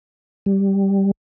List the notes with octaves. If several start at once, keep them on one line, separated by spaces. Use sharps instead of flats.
G3